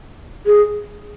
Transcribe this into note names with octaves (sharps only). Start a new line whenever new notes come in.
G#4